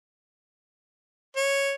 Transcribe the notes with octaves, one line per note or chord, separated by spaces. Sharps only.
C#5